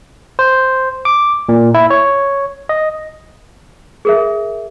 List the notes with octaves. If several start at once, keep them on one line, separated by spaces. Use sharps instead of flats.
C5
D6
A#2
E4
C#5
D#5
G#4 A#4 E5